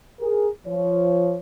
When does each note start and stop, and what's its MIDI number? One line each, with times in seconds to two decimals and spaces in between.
0.20 0.49 68
0.20 0.49 70
0.67 1.39 53
0.67 1.39 73